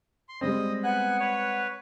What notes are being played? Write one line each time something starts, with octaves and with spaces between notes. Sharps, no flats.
C6
G3 G#3 C4 D#5
B3 F#5 G#5 F#6
B4 C#5